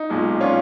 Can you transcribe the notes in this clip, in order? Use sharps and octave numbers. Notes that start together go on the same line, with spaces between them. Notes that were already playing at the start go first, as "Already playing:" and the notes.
Already playing: D#4
B1 A#2 G#3
C#4 F4